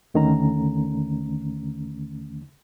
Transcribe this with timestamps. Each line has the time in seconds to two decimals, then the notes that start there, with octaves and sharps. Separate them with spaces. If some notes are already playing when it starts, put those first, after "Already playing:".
0.14 D#2 D3 D#3 A3 C#4 A#5